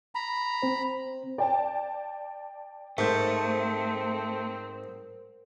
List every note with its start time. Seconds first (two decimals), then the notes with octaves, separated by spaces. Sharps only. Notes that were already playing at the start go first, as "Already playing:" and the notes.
0.15 A#5 B5
0.62 C4 C5
1.38 D5 G5 A5
2.98 G#2 A3 C4 A#4 C5 G6